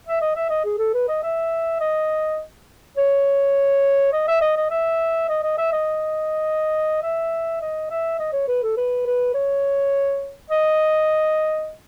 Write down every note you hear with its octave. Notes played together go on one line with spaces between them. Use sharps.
E5
D#5
E5
D#5
G#4
A4
B4
D#5
E5
D#5
C#5
D#5
E5
D#5
D#5
E5
D#5
D#5
E5
D#5
E5
D#5
E5
D#5
C#5
B4
A4
B4
B4
C#5
D#5